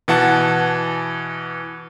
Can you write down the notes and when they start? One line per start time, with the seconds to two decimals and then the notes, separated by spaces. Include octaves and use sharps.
0.08 B2 E3 F#5 A5